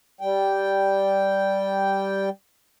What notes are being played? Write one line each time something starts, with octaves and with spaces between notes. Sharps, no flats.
G3 G5